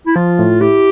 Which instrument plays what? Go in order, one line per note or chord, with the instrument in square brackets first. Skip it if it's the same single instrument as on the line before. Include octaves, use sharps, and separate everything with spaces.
[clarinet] E4
[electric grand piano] F3 [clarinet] F4
[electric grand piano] A2
[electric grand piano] E4 [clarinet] G4